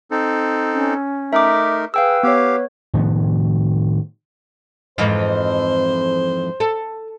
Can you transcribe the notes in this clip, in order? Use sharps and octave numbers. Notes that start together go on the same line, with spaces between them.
C4 D#4 A4
C#4
A3 D#4 A#4 E5 D6
G#4 B4 F5 G5 E6
B3 G4 C#5 F5
A2 D#3 F3 B3
F2 G#2 E3 C5
A4